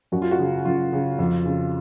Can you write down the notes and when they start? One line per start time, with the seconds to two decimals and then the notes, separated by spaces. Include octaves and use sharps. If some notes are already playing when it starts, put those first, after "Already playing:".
0.12 F#2 F#4
0.22 F4
0.31 F#4
0.39 C#3
0.65 F#2 F4
0.93 C#3
1.19 F2
1.45 C#3